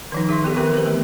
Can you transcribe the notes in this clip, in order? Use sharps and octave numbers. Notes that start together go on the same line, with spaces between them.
D#3 F3 D#4
G#4 E5 C6 C#6
B3 G4 A4
D#3 E3 C4 G4 A#4
B4 C5
A3 B3